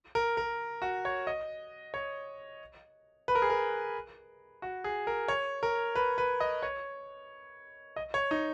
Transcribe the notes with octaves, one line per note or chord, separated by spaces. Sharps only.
A#4
A#4
F#4
C#5
D#5
C#5
B4
A#4
G#4
A#4
F#4
G#4
A#4
C#5
A#4
B4
B4
D#5
C#5
D#5
C#5
D#4